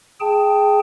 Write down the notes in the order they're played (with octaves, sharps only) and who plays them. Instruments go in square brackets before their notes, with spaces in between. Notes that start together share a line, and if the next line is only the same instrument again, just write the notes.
[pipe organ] G#4 G5 A5